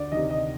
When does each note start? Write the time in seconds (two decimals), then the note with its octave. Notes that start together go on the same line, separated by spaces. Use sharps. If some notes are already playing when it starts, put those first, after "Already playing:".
Already playing: D2 D5
0.12 C3 D#3 D#5
0.30 D#5